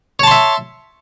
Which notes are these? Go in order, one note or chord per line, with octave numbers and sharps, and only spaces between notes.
C#5 E5 A5 C6